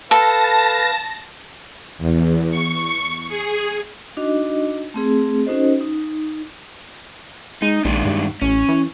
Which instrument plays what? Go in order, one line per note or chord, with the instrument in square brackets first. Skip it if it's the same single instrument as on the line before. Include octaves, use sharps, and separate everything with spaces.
[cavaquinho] A4 [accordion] B4 F5 [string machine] A5 A#6
[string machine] E2
C#6
G#4
[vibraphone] D4 D#4 F#4 D#5
A3 C4 G#4
C#4 D#4 F#4 A4 C5 D#5
D#4
[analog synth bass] G#3 [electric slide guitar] D#4
[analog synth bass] A#1 [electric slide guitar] D#3 G#3 D4
[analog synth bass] G2
[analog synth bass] A1 [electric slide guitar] C#4
[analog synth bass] E3